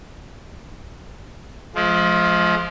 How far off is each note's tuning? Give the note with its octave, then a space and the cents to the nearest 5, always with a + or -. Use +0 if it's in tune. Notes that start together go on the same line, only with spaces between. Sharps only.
F3 +0 G#3 +35